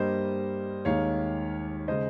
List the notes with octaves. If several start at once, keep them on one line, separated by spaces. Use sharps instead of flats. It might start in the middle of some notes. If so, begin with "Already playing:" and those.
Already playing: G2 G3 A#3 C5 D#5
D#2 D#3 G#3 C#5 F5
C#3 G#3 C5 D#5